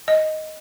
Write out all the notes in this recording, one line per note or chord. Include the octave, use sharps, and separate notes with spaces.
D#5